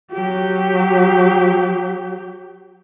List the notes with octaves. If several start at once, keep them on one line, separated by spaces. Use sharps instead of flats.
F#3 G4